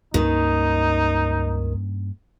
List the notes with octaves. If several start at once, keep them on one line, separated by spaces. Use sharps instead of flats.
C#2 G2 D#3 A#3 C#4 D#4